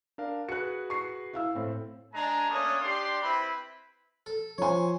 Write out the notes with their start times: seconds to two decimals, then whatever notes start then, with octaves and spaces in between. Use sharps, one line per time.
0.18 D4 A#4 F5
0.49 F#4 G#4 B4 F#6 C#7
0.90 C#6 C7
1.33 E4 F5 E6
1.55 A2 C4
2.13 G#3 D4 G#5 A#5
2.49 A3 A#3 C#4 D4 C#5 D#6
2.82 D4 G4 D5 C6
3.22 C4 E4 B4 B5
4.26 A4
4.58 F3 C5 C#5 G#5